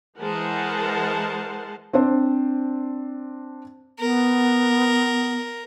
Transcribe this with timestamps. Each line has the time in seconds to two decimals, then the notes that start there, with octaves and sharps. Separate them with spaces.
0.19 E3 G#3 A#4 C5 F#5 A5
1.93 C4 D4 C5
4.00 B3 A#4